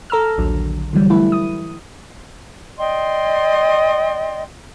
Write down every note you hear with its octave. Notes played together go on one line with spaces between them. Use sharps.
A4 A#5 E6 F6
A#1 D#2 D3 F#3
D3 E3 F#3 G3
E3 A3 E4 B4
D#6
D5 D#5 G5 C6